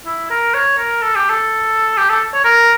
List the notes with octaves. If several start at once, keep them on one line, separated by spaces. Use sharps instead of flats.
E4
A#4
C#5
A#4
A4
G4
A4
G4
A4
C#5
A#4